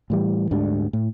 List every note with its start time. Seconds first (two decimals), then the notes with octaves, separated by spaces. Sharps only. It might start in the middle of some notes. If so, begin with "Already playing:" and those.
0.10 A2 E3 G3
0.51 D2 G#2 G3 D4
0.93 A2